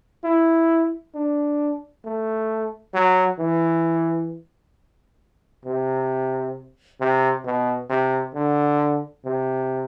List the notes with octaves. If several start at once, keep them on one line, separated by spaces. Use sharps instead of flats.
E4
D4
A3
F#3
E3
C3
C3
B2
C3
D3
C3